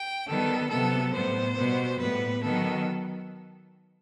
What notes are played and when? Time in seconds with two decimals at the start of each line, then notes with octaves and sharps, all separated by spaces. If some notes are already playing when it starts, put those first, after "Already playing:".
Already playing: G5
0.26 D#3 G3 B3 A4
0.69 C3 F#3 B3 A4
1.12 A2 G3 B3 C5
1.56 B2 G3 B3
1.98 A2 G3 B3 B4
2.42 D#3 F#3 B3 A4